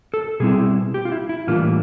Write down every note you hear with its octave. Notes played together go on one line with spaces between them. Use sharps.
A4
B2 G3 C4 E4 G#4
G4
F4
E4
E4
A2 E3 G3 A#3 D4 F4